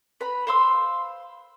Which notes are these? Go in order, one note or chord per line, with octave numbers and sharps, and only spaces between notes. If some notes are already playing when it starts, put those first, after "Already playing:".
B4 A#5 B5
C5 F5 C6 E6